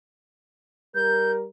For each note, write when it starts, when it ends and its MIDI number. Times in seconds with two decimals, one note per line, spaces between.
0.95 1.46 55
0.95 1.46 70
0.95 1.32 91